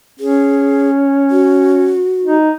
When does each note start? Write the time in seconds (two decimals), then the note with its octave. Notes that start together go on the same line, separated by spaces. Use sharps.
0.19 C#4 G#4
1.30 F#4
2.24 D#4